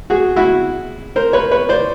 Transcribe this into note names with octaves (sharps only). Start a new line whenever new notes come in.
F#4 G#4
E4 F#4
A#4 C5
B4 C#5
B4 C#5
C5 D5